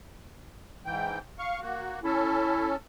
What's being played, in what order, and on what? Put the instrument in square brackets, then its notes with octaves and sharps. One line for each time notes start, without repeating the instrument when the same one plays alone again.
[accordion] G#2 E3 G5
F5 C#6
A#3 F#4
[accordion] C#4 A4 [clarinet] E4